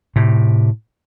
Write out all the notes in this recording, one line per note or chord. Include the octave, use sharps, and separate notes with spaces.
A2 C3